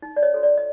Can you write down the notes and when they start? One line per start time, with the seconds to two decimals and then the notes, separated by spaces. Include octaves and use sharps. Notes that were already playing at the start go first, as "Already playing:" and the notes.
0.02 D#4
0.16 D5
0.22 C#5 D#5
0.32 F#4 A4 C5
0.43 D5
0.57 D#5